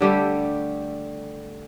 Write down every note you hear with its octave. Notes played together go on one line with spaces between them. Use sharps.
D3 G3 A3 G4